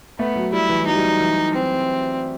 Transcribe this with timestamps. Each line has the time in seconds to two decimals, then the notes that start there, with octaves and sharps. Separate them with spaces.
0.19 A3 B3
0.36 F#3
0.53 G3 E4
0.69 E3
0.87 F#3 D#4
0.95 G3
1.03 F#3
1.20 E3
1.54 C4